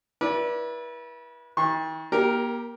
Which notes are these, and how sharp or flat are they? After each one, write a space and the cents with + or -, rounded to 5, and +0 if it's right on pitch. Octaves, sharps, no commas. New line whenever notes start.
E4 +0 B4 -35 D5 +0
D#3 +45 C#6 -30
A#3 +35 G4 +0 A#4 +0